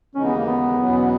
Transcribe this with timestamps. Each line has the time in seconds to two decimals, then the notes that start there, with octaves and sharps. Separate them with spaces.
0.15 D#2 C#3 E3 G#3 C#4 D#4
0.25 B3
0.35 A#3
0.46 B3
0.77 E2 B2 F#3 C#4